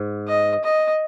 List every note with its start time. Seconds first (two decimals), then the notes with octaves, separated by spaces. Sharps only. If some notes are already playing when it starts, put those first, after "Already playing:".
Already playing: G#2
0.27 D#5
0.64 D#5